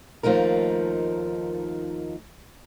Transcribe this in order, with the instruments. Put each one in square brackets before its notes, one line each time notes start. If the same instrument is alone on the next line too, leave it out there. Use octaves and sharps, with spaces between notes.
[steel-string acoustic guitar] D#2 F3 A3 D#4 A#4